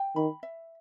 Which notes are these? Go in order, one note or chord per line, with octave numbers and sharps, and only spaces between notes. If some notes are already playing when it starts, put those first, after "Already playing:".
Already playing: G5
D#3 B5
E5